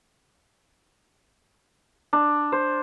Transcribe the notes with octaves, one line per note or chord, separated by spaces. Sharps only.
D4
C5